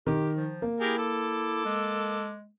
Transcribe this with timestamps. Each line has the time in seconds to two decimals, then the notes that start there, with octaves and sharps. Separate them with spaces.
0.07 D#3 G4
0.37 F3
0.62 A#3
0.80 E4 G4 G#4 A#4
0.98 A4 D6
1.65 G#3